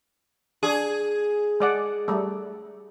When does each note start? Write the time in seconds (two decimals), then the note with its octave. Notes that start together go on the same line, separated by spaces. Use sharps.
0.63 D4 G#4
1.60 G#3 D5 F#5
2.08 G3 A3